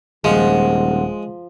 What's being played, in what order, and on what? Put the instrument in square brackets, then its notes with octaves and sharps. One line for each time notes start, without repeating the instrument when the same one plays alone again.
[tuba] D#1 [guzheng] F3 [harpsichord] G#3 [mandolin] F#4 F5 F#5